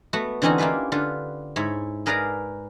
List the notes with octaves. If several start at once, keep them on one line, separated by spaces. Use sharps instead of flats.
A3 B3 F#4
D3 E3 C4 C#4 D#4 F#4
A#3 E4 F4 G4 B4
D3 F4 B4
G#2 E4 C#5
G#4 A#4 B4 D5 F5 A#5